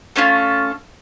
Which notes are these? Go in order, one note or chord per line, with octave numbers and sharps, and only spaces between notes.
A3 C#4 F4 A4